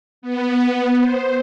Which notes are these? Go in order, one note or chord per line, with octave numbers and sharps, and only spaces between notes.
B3
C5